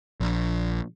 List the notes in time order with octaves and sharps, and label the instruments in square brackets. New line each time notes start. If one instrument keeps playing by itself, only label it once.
[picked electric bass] A#1